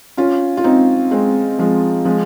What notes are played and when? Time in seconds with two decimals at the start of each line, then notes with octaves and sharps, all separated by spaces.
0.17 C#4 F4
0.57 F4
0.64 C4 D#4
1.11 G#3 C4
1.59 F3 G#3
2.05 F3 G#3